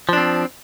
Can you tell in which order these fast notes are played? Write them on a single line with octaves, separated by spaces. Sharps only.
F3 D4 C4